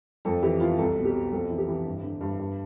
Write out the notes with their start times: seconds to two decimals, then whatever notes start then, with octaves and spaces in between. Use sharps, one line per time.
0.25 F2 A4
0.43 E3 G4
0.60 E3 F4
0.78 C2 A4
0.96 B2
1.05 G4
1.14 B2
1.32 F2 A4
1.49 E3
1.58 G4
1.68 E3
1.85 G2
2.03 D3
2.21 G2
2.39 G2